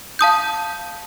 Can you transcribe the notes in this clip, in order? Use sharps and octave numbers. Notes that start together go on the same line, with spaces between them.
F5 A5 D#6 G6